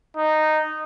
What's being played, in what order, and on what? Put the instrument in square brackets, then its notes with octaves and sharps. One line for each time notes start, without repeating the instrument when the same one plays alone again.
[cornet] D#4